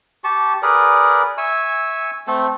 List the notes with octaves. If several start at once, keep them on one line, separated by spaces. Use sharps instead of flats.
G4 A5 C#6
G#4 A#4 B4 D5
E5 G#5 C#6 E6
A3 C4 A4